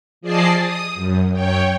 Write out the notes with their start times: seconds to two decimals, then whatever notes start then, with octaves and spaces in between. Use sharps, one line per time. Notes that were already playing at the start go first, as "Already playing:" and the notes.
0.21 F3 G#4 D5 D#5 A5 C7
0.60 D#6
0.94 F#2
1.32 F#2 C#5 G5